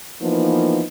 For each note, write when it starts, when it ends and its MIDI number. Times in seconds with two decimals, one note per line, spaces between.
0.22 0.83 52
0.22 0.83 53
0.22 0.83 58
0.22 0.83 59
0.22 0.83 63